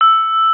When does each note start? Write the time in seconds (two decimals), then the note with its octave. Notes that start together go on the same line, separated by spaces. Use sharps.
0.01 E6